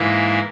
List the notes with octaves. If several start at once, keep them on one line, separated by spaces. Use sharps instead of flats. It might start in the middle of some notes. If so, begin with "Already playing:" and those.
Already playing: G#2 E3 A#3 E4